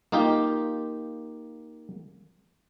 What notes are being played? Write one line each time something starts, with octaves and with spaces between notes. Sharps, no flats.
A#3 D#4 F4 G4